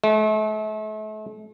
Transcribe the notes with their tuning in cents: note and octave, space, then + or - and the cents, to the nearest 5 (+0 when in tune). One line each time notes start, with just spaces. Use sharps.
A3 -40